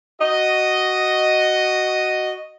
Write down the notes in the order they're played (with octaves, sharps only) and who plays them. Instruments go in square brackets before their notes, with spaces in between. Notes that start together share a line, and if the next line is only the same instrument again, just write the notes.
[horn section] F#4 D#5